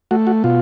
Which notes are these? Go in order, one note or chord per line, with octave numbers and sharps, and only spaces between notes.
A3 F#4
F#4
B2 F4